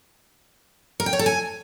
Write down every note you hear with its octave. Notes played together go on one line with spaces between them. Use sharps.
A#4
G5
C#5
A4
G#5